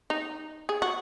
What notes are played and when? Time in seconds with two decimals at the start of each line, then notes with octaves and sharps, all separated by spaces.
0.10 D#4
0.69 G#4
0.82 F#4